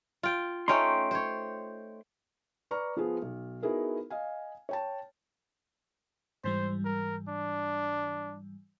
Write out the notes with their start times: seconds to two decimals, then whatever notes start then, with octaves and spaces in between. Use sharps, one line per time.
0.23 F4 G5
0.68 A3 C#4 D#4 G5 C6
1.11 C5 C#5
2.71 B4 D5 A#5 C#6 F6
2.97 F3 B3 F4 G#4
3.22 B1
3.63 B3 D#4 E4 F#4 G#4 A#4
4.10 D#5 F5 G#5
4.69 C#5 G5 A5
6.44 G#2 E3 G3 C5
6.85 A#4
7.28 D4